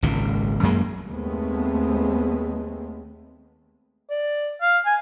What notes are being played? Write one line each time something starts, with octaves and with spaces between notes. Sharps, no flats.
G#1 C#2 A#2
F#2 F#3 G#3 A#3
D#2 G#3 A3 B3 C4
D5
F5
G#5